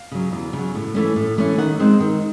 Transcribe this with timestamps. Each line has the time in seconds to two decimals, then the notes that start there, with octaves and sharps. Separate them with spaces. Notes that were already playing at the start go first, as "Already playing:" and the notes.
Already playing: F5
0.12 C#3 F#3
0.32 E2
0.53 C#3 F#3
0.75 A2
0.95 E3 A3 C#4
1.16 A2
1.37 E3 A3 C#4
1.58 D#3 F#5
1.79 G#3 C4 D#4
2.00 D#3